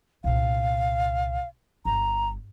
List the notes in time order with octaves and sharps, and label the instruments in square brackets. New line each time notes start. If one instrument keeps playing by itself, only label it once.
[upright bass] C2 A#2 [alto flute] F5
[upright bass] G1 [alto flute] A#5